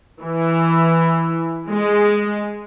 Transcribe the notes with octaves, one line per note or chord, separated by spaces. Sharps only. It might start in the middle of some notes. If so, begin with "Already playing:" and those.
E3
G#3